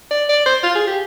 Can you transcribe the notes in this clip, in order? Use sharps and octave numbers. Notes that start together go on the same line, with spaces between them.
D5
D5
C5
F4
G#4
G4